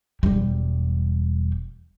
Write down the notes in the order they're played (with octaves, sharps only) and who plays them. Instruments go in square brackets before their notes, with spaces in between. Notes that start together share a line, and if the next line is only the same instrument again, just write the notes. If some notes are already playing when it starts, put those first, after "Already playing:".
[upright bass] E1 G3